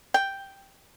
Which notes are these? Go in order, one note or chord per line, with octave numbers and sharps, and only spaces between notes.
G5